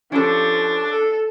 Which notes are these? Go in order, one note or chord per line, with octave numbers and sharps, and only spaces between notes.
F3 C#4 D4 G4 A4
A4